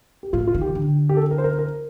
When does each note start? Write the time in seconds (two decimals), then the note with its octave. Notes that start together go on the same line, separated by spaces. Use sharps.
0.23 G4
0.33 A2 F4
0.47 F4
0.54 D#3
0.61 G4
0.75 D3
1.09 G4
1.16 A4
1.31 A#4
1.38 C5
1.44 A#4
1.59 A#4